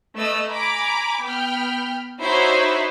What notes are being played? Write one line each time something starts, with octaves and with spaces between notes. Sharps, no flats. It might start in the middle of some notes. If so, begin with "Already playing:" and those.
A3 B4 D#5 E6
G#5 A#5 B5 D6
B3 G5 B5 F6
D#4 E4 F#4 C5 C#5 E5